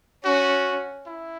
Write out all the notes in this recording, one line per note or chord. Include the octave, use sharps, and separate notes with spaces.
C#4 F#4
E4